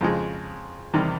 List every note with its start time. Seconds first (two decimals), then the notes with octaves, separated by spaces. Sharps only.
0.01 F2 C#3 F3 G#3
0.94 E2 C3 D#3 G3